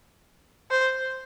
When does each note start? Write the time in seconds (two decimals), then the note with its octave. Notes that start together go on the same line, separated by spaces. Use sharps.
0.71 C5